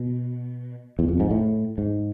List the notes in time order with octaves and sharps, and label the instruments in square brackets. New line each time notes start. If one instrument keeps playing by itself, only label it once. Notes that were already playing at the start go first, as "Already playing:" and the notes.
Already playing: [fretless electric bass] B2
E2
F2
G#2
A2
G#2